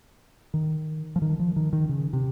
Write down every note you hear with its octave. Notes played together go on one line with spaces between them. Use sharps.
D#3
F3
D#3
F3
D#3
D#3
C#3
C3